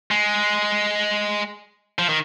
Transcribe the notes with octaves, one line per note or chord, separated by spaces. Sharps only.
G#3
F3
D#3